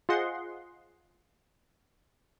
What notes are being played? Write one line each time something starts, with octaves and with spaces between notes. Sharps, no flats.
F4 G#4 C5 D#5 F#5 C6